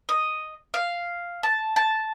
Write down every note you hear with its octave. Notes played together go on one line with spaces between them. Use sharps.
D#5
F5
A5
A5